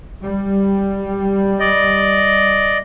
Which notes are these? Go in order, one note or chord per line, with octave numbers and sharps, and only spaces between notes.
G3
D5 D#5